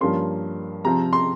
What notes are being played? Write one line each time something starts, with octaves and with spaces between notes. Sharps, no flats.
G2 F3 A#3 C#4 C6
C3 F3 C4 A#5
C6